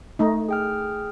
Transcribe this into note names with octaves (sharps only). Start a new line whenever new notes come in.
A3 D#4
G#4 G5 F6